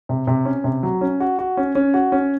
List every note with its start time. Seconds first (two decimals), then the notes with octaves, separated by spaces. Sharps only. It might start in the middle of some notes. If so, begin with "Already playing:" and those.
0.09 C3
0.27 C3
0.45 C#4
0.64 C3
0.83 F#3
1.01 C#4
1.20 F#4
1.39 F#4
1.57 C#4
1.75 C#4
1.94 F#4
2.12 C#4